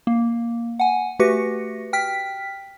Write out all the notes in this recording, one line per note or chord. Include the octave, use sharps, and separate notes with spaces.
A#3
F#5 G#5
A3 F#4 G4 B4 A#6 C#7
G5 F6 B6